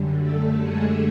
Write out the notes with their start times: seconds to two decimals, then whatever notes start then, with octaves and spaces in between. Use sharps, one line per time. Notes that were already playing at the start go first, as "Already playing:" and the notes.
Already playing: F#2 D3 G3
0.18 A3 A4
0.61 G#3 G#4